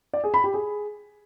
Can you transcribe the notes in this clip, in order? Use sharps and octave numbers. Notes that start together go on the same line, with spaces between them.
D5
G#4
B5
G4
G#4